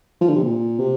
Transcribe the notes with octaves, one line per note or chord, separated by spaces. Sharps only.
F3
D3
C3
A#2
C3